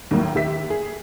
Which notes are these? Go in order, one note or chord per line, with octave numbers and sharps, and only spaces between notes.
D#2 A2 F#3 A#3
D#2 D#3 G4 E5 B6
G#4